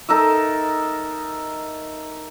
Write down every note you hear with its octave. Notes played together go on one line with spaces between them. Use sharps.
D#4 A4 A#4 E5